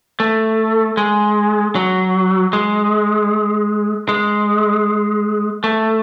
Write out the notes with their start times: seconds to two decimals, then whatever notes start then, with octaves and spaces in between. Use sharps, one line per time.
0.20 A3
0.97 G#3
1.75 F#3
2.53 G#3
4.09 G#3
5.64 A3